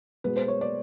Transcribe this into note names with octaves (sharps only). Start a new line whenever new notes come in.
B2 G#3 B4
C5
C#5
D5